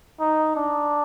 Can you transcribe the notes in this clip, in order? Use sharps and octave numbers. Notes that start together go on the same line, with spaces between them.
D#4
D4